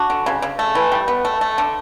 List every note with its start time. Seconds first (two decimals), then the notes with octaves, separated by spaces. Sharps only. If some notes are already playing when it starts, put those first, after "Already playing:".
Already playing: D4 F#4
0.10 D3
0.26 C#3
0.42 C#3
0.59 A3
0.75 E3
0.92 G3
1.08 B3
1.25 A3
1.41 A3
1.58 D3